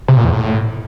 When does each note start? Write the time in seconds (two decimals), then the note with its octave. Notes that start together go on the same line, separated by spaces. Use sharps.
0.08 C3
0.16 A#2
0.25 E2
0.33 A2